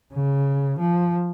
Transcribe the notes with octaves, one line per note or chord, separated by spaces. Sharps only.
C#3
F3